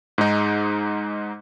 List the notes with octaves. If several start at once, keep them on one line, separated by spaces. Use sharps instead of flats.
G#2 G#3 D#4